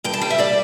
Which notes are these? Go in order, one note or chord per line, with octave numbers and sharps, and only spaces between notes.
G2 G5
A5
G3 G5
E5
G3 D5